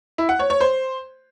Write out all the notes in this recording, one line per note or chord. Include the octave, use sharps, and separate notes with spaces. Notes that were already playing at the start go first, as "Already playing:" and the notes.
E4
F#5
C#5
C#5
C5